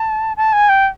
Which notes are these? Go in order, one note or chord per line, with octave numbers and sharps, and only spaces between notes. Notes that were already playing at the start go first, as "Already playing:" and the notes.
Already playing: A5
A5
G#5
G5